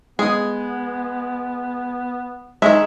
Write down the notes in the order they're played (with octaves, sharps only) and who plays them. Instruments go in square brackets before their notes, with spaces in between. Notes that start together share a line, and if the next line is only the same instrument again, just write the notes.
[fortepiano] G#3 D#6 [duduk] B3 [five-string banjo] G#4
[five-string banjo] D#3 E5 [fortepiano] G#3